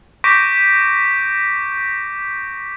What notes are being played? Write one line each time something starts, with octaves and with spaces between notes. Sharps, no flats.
C#6 D6 G6 A#6 B6 D7